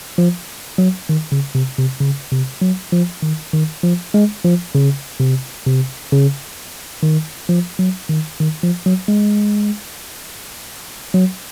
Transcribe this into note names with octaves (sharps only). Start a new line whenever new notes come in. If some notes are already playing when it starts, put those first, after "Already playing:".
F3
F#3
D#3
C#3
C3
C3
C#3
C3
F#3
F3
D#3
D#3
F3
G#3
F3
C#3
C3
C3
C#3
D#3
F3
F#3
D#3
D#3
F3
F#3
G#3
F#3